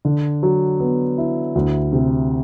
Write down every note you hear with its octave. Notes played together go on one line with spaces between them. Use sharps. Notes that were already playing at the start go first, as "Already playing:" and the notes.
D3
F#3
B3
E4
D2
C3